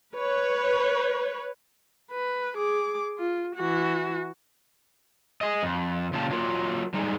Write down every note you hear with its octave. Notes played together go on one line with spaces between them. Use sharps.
B4 C#5
B4
G#4 D6
F4
E3 F#4
G#4 D#5
F2
A#2 C#3 F4 G4 A5
F#3 F4 A#4
G3 G#3 D#4